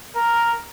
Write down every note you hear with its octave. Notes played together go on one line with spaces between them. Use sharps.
A#4